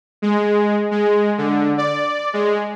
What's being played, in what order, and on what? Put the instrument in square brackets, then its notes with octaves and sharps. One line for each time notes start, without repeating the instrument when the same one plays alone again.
[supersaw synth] G#3
G#3
D3
D5
G#3